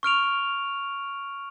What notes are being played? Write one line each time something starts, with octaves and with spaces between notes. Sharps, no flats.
C#6 F6 D7 F7